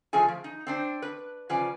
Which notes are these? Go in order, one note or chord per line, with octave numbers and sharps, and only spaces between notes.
C3 F3 A3 G#4 G#5
F3
D#4
C4 D4 C5
B4
C#3 F3 B4 D5 G#5